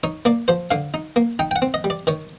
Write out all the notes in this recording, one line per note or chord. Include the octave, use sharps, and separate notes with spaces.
D#4 C#5
A#3 D5
F3 C5
D3 F5
D#4
A#3
D#4 G5
G5
F#5
C4
D#5
G3
D5
D#3 C#5